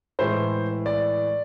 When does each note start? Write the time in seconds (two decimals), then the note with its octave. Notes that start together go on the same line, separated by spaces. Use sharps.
0.19 A2 E3 G#3 C5
0.86 D5